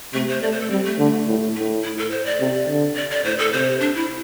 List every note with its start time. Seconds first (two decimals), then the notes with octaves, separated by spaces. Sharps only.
0.14 C3 A3
0.28 C5
0.42 A3 D5
0.52 C5
0.61 A4
0.70 G3 C4
0.85 A3
0.99 D3
1.27 A2
1.55 A2 A3
1.84 E4
1.98 A4
2.11 C5
2.26 D5
2.40 C3
2.68 D3
2.96 D5
3.11 D5
3.24 A2 C5
3.39 A4
3.52 C3 C5
3.80 D4
3.95 E4